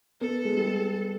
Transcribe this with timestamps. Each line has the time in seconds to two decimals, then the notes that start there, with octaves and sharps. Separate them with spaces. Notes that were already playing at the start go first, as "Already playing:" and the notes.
0.21 B3 A4
0.45 G#3
0.57 G3